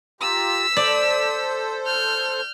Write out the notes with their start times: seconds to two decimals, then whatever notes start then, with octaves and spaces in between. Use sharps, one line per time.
0.21 F4 G4 A#5 E6 B6
0.77 A4 C5 D5
1.85 F6 G6